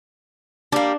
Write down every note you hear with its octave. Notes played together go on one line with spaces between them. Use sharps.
G3 A#3 D4